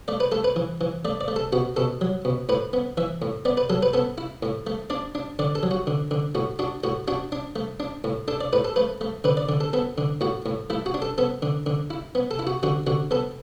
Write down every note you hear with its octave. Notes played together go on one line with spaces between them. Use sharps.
A3 D5
B4
A3 A4
B4
E3
E3
A3 D5
D5
A3
A4
B2 F#4
B2 A4
F#3
B2
A2 B4
B3
E3 E5
A2
B3 D5
B4
F#3 A4
B4
B3 A4
E4
A2
A3
D4 D5
D4
D3 D5
A4
F#3
F#4
D3
D3
A2 F#4
D4 F#4
A2 F#4
D4 F#4
D4
A3
D4
A2
D4 A4
D5
A2 B4
A4
A3 B4
A3
D3 B4
D5
D3
A4
B3 A4
D3
A2 F#4
A2
A3 E4
F#4
D4
A4
B3 A4
D3
D3
E4
B3
A4
E4
F#4
D3 F#4
D3 F#4
B3 A4